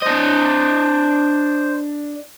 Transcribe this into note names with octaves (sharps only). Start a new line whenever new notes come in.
D4 C5 D#5